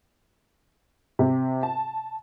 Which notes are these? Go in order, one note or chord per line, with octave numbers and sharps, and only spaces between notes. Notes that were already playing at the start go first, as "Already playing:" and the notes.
C3
A5